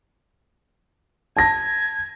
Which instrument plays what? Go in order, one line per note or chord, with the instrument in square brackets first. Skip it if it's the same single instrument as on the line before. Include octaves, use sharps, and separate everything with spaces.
[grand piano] A5 A#6 [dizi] G#6